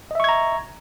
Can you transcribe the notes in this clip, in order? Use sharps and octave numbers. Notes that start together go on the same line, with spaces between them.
D#5 E5 A#5 C#6 G#6